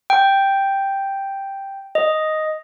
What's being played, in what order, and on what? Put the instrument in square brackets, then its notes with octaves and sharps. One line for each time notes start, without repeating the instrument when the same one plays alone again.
[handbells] G5
D#5